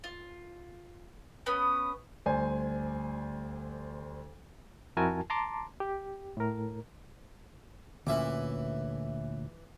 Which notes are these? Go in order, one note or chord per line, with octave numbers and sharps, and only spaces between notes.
F4
B3 C#4 D#6
D2 G3 C5 D5 G#5
F2 E4 F#4 A#4 G#5 A5
A5 A#5 C6 D6
G4
A2 A#4
D2 A#2 E3 C#4 E5 D6